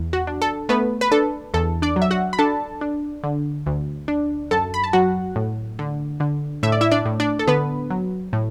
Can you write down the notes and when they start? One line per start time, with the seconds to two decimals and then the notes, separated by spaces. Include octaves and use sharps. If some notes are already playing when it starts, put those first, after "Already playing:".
Already playing: E2
0.13 F#4
0.27 D4
0.42 A4
0.69 A3 B3 B4
1.01 B4
1.11 D4 A4
1.54 E2 A4
1.82 D4 D5
1.96 F#3
2.02 E5
2.11 F#4 F#5
2.33 B5
2.39 D4 A4 A5
2.81 D4
3.23 D3
3.66 D2
4.08 D4
4.51 F#2 A4 A5
4.74 B5
4.84 A5
4.93 F#3 F#4 F#5
5.36 A2
5.79 D3
6.20 D3
6.63 A2 E5
6.72 D5
6.81 E4 E5
6.91 D4 D5
7.06 A2
7.20 D4 D5
7.39 A4
7.48 D3 B3 B4
7.90 F#3
8.33 A2